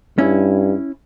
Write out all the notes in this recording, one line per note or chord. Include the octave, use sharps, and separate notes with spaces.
G2 C#4 E4